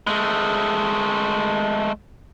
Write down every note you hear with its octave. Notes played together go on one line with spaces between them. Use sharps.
G#3 A3